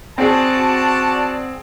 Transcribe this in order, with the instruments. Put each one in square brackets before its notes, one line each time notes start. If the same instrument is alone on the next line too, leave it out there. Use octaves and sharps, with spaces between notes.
[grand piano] C4 G#4 [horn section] F#4 D5 A5